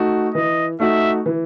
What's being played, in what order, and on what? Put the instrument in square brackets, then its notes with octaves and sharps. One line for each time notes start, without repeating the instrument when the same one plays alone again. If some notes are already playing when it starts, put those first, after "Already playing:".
Already playing: [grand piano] A3 D#4 F#4
[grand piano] E3 [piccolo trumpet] D#5
[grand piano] A3 D#4 F#4 [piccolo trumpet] E5
[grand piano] E3